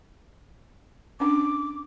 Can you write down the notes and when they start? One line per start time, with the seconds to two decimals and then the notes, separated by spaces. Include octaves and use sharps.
1.20 C#4 D4 D6